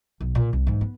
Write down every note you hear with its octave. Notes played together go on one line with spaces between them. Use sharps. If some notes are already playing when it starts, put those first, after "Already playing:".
B1
A#2
C2
G#2 E3
B3